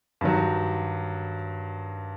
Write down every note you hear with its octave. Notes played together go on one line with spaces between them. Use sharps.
G2 D#3 F#3